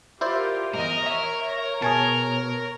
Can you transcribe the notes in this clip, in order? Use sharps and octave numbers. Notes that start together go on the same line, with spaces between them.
E4 F4 G4 A#4 C5 D5
E2 G#2 A#4 D#5
C#5 E5
B2 G#4 A#4 G#5 A5